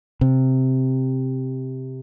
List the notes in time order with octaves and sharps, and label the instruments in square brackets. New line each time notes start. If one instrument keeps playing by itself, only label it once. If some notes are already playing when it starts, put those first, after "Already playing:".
[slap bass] C3